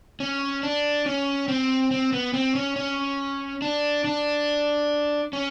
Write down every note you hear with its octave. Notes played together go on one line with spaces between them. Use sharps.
C#4
D4
C#4
C4
C4
B3
C4
C#4
C#4
D4
D4
C#4